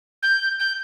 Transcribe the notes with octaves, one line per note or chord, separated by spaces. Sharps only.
G6
G6